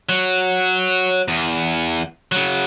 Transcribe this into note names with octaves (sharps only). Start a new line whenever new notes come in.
F#3
E2
C#3 F#3